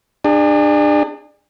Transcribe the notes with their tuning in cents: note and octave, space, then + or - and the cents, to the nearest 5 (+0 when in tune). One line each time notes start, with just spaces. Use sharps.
D4 +30 G#4 -35